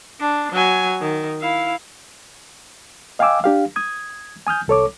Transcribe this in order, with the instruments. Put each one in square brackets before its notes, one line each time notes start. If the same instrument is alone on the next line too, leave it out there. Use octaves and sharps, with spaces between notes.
[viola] D4
F#3 G#5
D#3
E4 F5
[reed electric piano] D#5 F5 G5 G#5 D6 E6
D4 G4 F5
D#6 G#6
G#5 D#6 F6 G6
C2 A4 C#5 D6